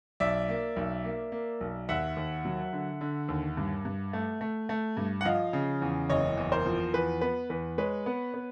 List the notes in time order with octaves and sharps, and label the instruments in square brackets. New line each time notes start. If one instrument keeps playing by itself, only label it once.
[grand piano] B1 D5 E5
A#3
B1
A#3
A#3
B1
D#2 E5 F#5
D#2
F#3
D3
D3
D#2
G2
G2
A3
A3
A3
G2
F#5
F3 D#5 F5
C#3
E2
F#1 C#5 D#5
E2
A#4 C5
F3
E2 B4
B3 B4
E2 B4
G#3 B4 C#5
B3
B3